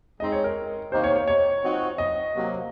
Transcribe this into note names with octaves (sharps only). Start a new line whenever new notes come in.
G#3 C4 D#4 D#5
C#5
A#4
C3 D#3 A#3 C5
C#5
C#5
C#5
F3 C4 D#4 F#4
D#5
C3 F#3 A#3